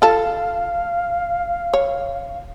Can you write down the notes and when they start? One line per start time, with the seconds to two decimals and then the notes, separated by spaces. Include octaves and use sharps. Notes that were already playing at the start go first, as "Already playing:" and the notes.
0.02 F4 A4 F5
1.74 C#5